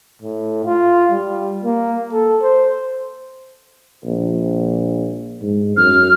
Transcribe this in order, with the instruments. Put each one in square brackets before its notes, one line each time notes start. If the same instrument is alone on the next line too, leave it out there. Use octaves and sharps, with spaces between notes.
[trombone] A2
F4
G3
A#3
A4
C5
[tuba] A#1
G#2
[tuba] F#2 [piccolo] F6